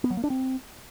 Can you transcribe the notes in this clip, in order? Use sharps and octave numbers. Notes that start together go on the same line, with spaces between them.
B3
F#3
A#3
D4
C4